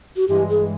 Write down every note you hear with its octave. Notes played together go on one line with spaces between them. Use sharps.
F#4
G2 E3 G#3 G4
G#4